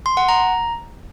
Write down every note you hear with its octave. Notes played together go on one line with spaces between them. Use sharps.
C6
F#5
A#5